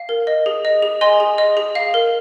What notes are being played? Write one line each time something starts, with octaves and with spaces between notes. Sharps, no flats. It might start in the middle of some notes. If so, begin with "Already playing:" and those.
Already playing: F5
A#4
D#5
G#4
D#5
G#4
D#5 G#5 C6
G#4
D#5
G#4
F5
A#4